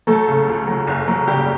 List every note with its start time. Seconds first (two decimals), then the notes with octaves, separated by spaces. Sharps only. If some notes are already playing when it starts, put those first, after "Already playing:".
0.07 F#3 A3 A4
0.28 C#3
0.48 C#2
0.67 F#3
0.87 F#1
1.08 F#3
1.27 C#3 G3 G4